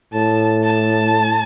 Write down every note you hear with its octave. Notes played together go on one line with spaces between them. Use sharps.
A2 A5
A5